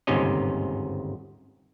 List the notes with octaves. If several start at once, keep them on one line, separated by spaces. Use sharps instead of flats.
G1 D#2 G#2 C3 C#4 D#5